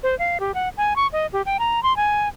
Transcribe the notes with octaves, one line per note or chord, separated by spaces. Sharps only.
C5
F5
G4
F#5
G#5
C#6
D#5
G4
G5
A#5
C6
G#5